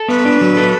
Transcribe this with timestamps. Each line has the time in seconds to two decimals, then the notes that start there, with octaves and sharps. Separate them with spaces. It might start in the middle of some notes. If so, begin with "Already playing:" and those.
Already playing: A4
0.08 B3 B4
0.25 D4
0.41 F#3
0.57 A4